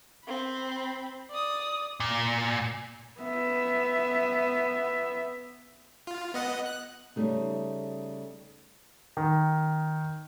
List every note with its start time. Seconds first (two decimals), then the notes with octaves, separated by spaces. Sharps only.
0.25 C4 B5
1.30 D5 D#6
2.00 A#2
3.20 B3 E5
6.07 F4
6.34 B3 D#5 F#5
6.66 F#6
7.16 C#3 G3 A3 D#4
9.17 D#3